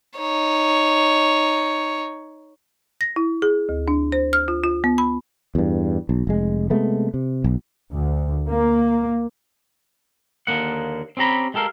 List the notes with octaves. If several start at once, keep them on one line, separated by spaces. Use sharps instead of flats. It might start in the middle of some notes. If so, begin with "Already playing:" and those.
D#4 C#5
A#6
E4
G#4
D2
D4
C5
F6
F4
F4
B3
B5
E2 G2
B1
F1 G#3
C3 G#3 A3 B3
C3
B1
D2
A#3
D#2 D3 A#3 F#5
C4 C#4 G4 A#5 B5
G#3 G4 A4 A#4 F5